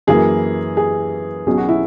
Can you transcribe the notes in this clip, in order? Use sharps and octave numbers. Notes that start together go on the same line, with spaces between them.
F#2 E3 A#3 G#4
G#4
B1 B2 F#3 C#4 G#4
F#4
E4